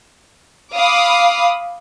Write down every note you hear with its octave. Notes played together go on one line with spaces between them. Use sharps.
F5 B5 D6 D#6